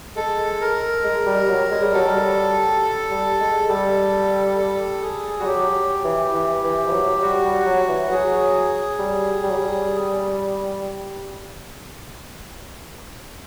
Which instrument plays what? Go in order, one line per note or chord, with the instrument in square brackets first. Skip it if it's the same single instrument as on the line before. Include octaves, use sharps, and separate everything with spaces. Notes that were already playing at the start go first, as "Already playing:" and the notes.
[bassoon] G#3 [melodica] A4
[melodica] A#4
[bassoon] G#3
G3
F#3
G#3
G3
[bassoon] F#3 [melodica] A4
[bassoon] G3
G3
G#3
[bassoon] G3 [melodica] A4
[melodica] A4
G#4
[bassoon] G3 [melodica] F#4
[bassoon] F#3 [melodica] G4
[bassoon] E3
E3
E3
F3
F#3
[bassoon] G3 [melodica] F#4
[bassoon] G3
F#3
E3
[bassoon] F#3 [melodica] G#4
[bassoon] G3
G3
F#3
G3